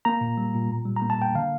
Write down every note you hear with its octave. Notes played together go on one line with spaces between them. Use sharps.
A#3 A#5
A#2
G3
A#2
A2
G3
A#5
A#3
A5
A#3 G5
D3 F5